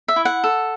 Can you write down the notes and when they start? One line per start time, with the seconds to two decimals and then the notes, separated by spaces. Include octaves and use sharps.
0.08 E5
0.16 E4
0.25 F#5
0.44 A4